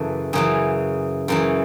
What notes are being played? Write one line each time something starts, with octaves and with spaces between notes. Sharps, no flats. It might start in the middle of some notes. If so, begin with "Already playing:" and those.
Already playing: F#2 C#3 E3 A4
F#2 C#3 E3 G#4
F#2 C#3 E3